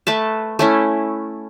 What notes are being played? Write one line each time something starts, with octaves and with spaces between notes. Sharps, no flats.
A3 B4 A5
A3 C#4 E4